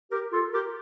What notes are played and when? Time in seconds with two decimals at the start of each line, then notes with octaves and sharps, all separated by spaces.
0.11 G4 A#4
0.32 F4 A4
0.53 G4 A#4